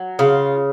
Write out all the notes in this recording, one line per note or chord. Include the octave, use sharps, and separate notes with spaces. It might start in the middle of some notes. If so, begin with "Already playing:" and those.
Already playing: F#3
C#3 F4